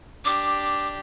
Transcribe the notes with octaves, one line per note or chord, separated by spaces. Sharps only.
D4 G4 D6